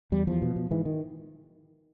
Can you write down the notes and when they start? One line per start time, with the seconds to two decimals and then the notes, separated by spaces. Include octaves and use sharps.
0.12 E2 G3
0.27 E2 F3
0.42 B2
0.56 B2
0.71 G#2 E3
0.85 D#3